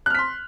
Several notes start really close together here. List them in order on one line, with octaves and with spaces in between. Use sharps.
F#6 F6 B6 C6